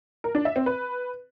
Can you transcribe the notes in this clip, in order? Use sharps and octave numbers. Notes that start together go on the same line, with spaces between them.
A#4
D4
E5
C4
B4